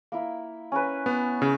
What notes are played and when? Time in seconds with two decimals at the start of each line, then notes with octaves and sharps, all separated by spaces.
0.12 A#3 E4
0.72 C#4 A#4 B4
1.06 B3
1.42 C#3